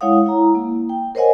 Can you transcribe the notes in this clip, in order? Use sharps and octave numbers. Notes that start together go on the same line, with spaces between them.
G#3 E4 C#5 F5 F#5 D#6
E4 A#5
A#3
G5
A#4 C5 C#5 D#5 F#5 G#5